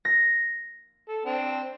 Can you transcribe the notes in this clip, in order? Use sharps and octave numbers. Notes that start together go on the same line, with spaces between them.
A#6
A4
C4 D4